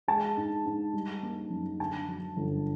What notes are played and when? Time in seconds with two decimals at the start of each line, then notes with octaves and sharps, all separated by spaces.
0.08 G#3 A5
0.37 G#2
0.66 G#2
0.93 G3
1.23 A#3
1.50 F#2
1.80 D3 A5
2.08 F#3
2.37 G1